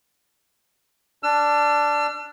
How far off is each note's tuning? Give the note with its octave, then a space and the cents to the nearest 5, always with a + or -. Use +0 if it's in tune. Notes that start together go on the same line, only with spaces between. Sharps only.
D4 +0 E6 +45